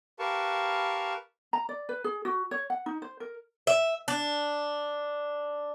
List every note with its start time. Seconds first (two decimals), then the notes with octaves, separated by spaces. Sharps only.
0.19 G4 A#4 B4 F5 A5 C#6
1.53 A#5
1.69 D5
1.89 B4
2.04 G#4
2.25 F#4
2.51 C#5
2.70 F#5
2.86 D#4
3.02 C5
3.20 A#4
3.67 E5
4.08 D4